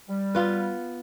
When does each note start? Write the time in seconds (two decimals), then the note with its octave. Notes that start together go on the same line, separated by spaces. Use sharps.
0.08 G3
0.35 B3 F4 B4